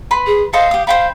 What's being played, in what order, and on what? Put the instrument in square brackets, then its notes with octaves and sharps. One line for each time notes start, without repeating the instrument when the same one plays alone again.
[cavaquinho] B4 B5 C6
[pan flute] G#4
[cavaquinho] A4 C5 D#5 [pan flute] F5
[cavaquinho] G4 D#6
[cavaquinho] C5 G5 B5 [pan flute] F5